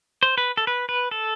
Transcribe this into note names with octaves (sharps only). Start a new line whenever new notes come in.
C5
B4
A4
B4
B4
A4